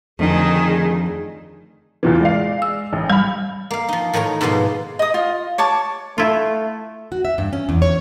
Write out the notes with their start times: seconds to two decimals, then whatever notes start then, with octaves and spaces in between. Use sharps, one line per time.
0.19 F1 F2 D3 D#3 F3 A3 G#4
2.03 E2 A#2 E3
2.20 G#3 D5 F5
2.62 E6
2.93 A1
3.10 G3 B5 F6
3.71 A#3 F5
3.88 F3 D#4
4.13 A2 D#3 A#4 C#5 A#5
4.41 G#2 B2 F3 G#3 A#3
4.99 D#5 D#6
5.14 F4
5.58 C#5 A5 D6
6.18 A3 E4 F4
7.12 F#4
7.25 E5
7.38 G2
7.53 C#4
7.69 E2
7.82 C#5